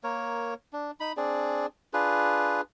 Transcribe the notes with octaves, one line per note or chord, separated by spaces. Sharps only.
A#3 A#4 C#5
D4
D#4 B5
C4 D4 G#4 D5
D4 F4 G#4 B4